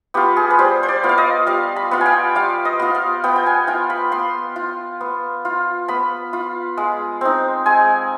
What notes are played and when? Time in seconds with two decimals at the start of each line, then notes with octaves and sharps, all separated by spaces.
0.14 B3 F4 G4
0.37 G#4
0.50 B4
0.59 G3 C5
0.83 C5
0.89 D5
1.04 B3 F4
1.09 F5
1.18 D#5
1.47 G3 F5
1.76 B5
1.91 B3 F4
2.01 G#5
2.06 G5
2.35 G3 F5
2.65 D#5
2.80 B3 F4
2.95 F5
3.24 B3 G5
3.36 G5
3.46 G#5
3.67 F4 G5
3.90 B5
4.12 B3 C6
4.56 F4
5.01 B3
5.45 F4
5.88 B3 B5
6.33 F4
6.77 G#3
7.21 C4 D#4
7.66 G#3 G#5